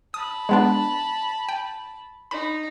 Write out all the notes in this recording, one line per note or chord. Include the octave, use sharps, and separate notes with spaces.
A5 B5 D#6
G#3 B3 D4
G5
D#4 B5